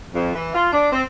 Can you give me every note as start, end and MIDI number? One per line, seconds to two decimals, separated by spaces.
0.13 0.34 41
0.35 0.51 52
0.54 0.68 65
0.72 0.88 62
0.92 1.02 60